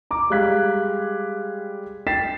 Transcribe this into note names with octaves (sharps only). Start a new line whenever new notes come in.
A#5 D6
G3 G#3 F5 F#6 G#6 B6
G5 A6 B6 C7 E7